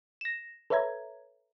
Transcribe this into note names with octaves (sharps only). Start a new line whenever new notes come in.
A#6 E7
A4 B4 C#5 E5 A#5 G#6